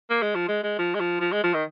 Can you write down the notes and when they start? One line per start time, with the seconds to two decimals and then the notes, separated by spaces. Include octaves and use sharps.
0.10 A#3
0.22 G#3
0.35 F3
0.48 G#3
0.63 G#3
0.78 F3
0.95 G#3
1.00 F3
1.21 F3
1.32 G#3
1.43 F3
1.54 D#3